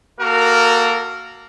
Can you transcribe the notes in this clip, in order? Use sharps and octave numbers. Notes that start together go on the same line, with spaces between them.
A#3 F#4 A4 A#4